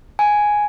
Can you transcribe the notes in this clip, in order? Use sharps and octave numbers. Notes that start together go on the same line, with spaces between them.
G#5